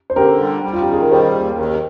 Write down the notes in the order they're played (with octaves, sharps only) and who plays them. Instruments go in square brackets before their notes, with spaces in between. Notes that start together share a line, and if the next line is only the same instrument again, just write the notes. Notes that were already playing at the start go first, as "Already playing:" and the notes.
[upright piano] C5
[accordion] D3 [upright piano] G4 A#4
[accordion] G3
G3
[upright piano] F4
G4
[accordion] D#3 [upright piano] G#4
[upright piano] A#4
[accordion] G3 [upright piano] G#4 C5
[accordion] D#2
[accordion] D#3 [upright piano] G4 A#4